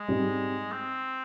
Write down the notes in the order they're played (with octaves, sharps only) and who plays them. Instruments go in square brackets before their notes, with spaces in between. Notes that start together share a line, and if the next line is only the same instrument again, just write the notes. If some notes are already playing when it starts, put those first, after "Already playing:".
Already playing: [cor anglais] G#3
[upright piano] G#2 G3 C4 D#4
[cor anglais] C4